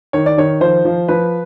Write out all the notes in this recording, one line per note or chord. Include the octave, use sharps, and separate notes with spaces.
D#3 C#5
D5
D#3 C#5
F3 C5
F3
F3 B4